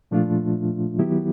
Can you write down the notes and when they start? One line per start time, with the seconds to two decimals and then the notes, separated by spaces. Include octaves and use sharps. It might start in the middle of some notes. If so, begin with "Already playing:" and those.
0.11 A#2 F3 A3 D4 F4
0.98 D#3 F#3 B3 E4 G4